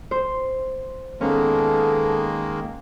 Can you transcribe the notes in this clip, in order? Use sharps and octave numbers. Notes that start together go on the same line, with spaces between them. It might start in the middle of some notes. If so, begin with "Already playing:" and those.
C5
D#3 G#3 A#3 B3 C#4 A4